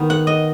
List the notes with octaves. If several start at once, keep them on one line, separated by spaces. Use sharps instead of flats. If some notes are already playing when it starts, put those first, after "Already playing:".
Already playing: D#3 B3
F#5
D#5